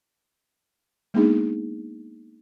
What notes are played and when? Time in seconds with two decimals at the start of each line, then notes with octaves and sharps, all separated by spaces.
1.14 G#3 A#3 B3 D4 D#4 G#4